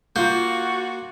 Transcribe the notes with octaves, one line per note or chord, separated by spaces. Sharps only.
A#3 F4 F#4 G6